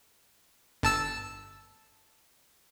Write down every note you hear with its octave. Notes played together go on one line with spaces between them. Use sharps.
G1 A5 E6